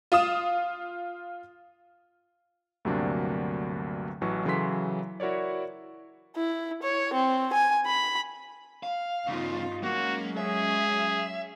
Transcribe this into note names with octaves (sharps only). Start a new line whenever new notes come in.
F4 F5 D#6 E7
D2 G2 C3 F#3 A#3 D4
A1 E3 F#3 C#6
C#3 E3 F#3 A4 C6 B6
E4 F#4 A#4 C#5 D5
E4
C#5
C4
G#5
B5
F5
E2 G2 C#3 D#4 F4
F#3 G#3 A#3 C#4 F#4
G#4 E5